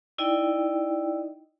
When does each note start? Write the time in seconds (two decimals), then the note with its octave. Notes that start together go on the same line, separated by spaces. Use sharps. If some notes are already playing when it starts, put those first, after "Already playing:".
0.18 D#4 E4 D5 D#5 G5